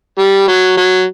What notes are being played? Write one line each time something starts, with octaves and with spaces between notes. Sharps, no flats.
G3
F#3
F#3